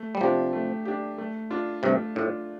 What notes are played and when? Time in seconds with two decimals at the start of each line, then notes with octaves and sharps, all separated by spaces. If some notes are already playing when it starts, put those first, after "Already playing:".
Already playing: A3
0.15 G3
0.21 C3 F3 D4 G4
0.53 A3
0.85 D4 G4
1.18 A3
1.50 D4 F4
1.83 G2 C3 A3
2.15 A2 D4 F4